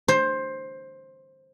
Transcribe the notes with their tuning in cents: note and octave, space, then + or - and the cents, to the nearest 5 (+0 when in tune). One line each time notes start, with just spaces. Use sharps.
C5 +15